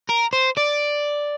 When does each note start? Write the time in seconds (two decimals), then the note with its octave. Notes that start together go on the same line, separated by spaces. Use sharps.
0.09 A#4
0.33 C5
0.57 D5